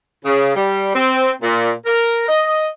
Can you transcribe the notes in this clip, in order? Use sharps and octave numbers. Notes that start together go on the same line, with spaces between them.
C#3
G3
C4
A#2
A#4
D#5